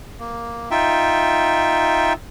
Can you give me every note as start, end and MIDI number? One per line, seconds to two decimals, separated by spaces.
0.19 0.69 58
0.71 2.13 63
0.71 2.13 65
0.71 2.13 76
0.71 2.13 79